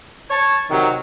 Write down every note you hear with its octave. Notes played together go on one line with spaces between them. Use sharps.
C#5 A5
C3 D#3 F#3 A#4